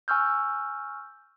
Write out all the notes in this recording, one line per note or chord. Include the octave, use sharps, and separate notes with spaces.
G#5 C#6 E6 F6 G6